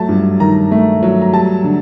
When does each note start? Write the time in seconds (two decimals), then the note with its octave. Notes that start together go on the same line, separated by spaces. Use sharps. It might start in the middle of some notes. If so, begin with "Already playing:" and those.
Already playing: F#3 A3 A5
0.09 G2
0.40 D#3 A#5
0.71 A3
1.03 F#3
1.22 A#5
1.33 G3 A5
1.64 D3